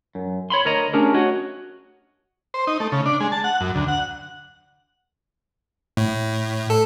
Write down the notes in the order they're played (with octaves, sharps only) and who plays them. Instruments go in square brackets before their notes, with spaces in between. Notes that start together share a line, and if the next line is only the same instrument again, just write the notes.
[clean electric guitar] F#2
C#5 B5 C6
D2 A#4 C#5 D#5 A#5
A3 C#4 D4 G4 G#4 A#4
F#4 C#5 D#5
[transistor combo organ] C5
D#4
A3
C#3
D4
G#3
A5
F#5
F#2
D2
F#5
[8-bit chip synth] A2
A4